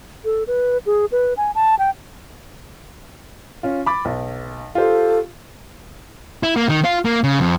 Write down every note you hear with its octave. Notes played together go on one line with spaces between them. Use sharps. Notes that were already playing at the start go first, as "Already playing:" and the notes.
A4
B4
G#4
B4
G#5
A5
G5
C#4 F4
B5 D6 A6
B1
F4 G4 A4 C5
E4
A#3
D#3
F4
A#3
C#3
F2